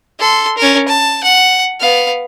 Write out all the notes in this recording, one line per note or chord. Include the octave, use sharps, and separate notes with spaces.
A4 C6
C#4 A#4
A5
F#5
B3 F5